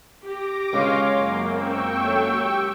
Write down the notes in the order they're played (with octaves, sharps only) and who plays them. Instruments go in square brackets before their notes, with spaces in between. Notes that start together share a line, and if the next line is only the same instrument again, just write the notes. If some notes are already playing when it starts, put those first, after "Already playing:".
[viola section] G4 [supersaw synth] D6 A#6
[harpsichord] C#2 C#3 [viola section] C#5 F5 C6
[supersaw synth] F#2 A#3
[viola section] C4 [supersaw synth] G5 C#6 E6
[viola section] F#3 A3
G4